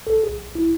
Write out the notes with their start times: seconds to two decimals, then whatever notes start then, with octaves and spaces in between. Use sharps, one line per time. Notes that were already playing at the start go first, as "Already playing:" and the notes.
0.07 B1 A4
0.23 G#4
0.29 B1
0.51 B1 E4